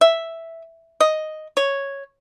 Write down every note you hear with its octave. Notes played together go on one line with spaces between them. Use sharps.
E5
D#5
C#5